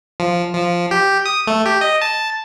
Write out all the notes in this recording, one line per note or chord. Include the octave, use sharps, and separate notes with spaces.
F3
F3
G4
D#6
A3
G4
D#5
A5